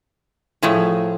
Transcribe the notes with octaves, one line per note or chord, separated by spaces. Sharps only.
A2 F3 A3 G#4